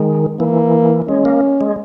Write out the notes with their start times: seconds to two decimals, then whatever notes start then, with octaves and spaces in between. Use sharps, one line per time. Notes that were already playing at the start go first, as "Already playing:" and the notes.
Already playing: D#3 G#3
0.39 E3 A#3
1.09 G#3 C#4
1.25 A#3
1.61 G#3